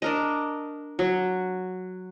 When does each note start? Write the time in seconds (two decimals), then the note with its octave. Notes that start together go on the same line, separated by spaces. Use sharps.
0.02 D4 A#4 D#5
0.99 F#3